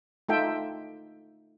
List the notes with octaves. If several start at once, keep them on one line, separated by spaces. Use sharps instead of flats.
A3 D#4 F4 A4 E5 G5